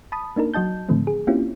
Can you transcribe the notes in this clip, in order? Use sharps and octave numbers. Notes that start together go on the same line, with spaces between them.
A5 B5 D#6
A#3 D4 D#4 A#4
F#3 F#4 D#5 A5 G6
A2 D3 D#3 F3 A3 C4
G#4
A#3 C4 C#4 E4 F4 G4